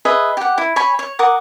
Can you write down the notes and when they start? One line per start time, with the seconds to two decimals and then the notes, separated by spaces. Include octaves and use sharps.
0.05 G#4 B4 D#5 E5
0.37 G4 F#5
0.58 E4
0.76 C#5 G#5 B5
0.99 C#5
1.19 A#4 F#5 D6 D#6